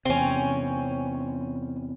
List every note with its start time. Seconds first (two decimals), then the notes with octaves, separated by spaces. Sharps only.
0.05 E2 C3 C4 C#4